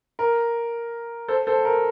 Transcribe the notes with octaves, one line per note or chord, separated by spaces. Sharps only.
A#4
A4 C5
A4 C5
A#4